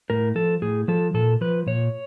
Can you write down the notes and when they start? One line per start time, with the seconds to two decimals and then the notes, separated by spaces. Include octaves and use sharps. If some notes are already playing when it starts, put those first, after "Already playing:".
0.10 A2 A#4
0.35 F3 A4
0.62 A2 G#4
0.88 F3 A4
1.14 A#2 A4
1.41 F3 B4
1.67 A#2 C#5